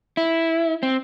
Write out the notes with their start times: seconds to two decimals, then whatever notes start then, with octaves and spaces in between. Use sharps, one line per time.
0.17 E4
0.83 C4